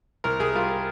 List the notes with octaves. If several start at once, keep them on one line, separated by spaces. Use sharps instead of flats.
C2 A#4
C2 G#4
G3 F4